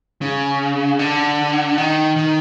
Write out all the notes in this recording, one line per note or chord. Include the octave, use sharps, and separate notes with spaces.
C#3
D3
D#3
D#3